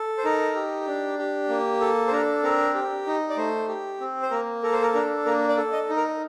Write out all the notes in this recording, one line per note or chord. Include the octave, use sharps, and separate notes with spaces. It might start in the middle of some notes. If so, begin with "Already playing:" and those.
Already playing: A4
C5
D#4 A#4
G4
D4
G4
A#3
A4
C5
D4 A#4
C4 A#4
G4
D#4
D5
A3 C5
G4
C4
C5
A#3 A#4
A4 A#4
C5
A#4
D4 A#4
A#3 A#4
D5
A4
D#5
D#4
A#4